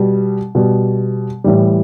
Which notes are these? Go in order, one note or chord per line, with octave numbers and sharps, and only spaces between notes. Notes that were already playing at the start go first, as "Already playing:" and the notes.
Already playing: B2 G3
B2 G3
A2 E3 G3